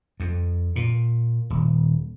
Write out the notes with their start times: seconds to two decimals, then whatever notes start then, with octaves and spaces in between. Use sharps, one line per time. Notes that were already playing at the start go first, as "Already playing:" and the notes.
0.20 F2
0.76 A#2
1.50 D#1